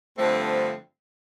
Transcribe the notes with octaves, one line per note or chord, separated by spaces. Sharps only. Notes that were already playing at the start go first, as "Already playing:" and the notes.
G2 D3 F3 A3 C4